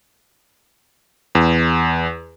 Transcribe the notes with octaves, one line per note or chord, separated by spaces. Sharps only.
E2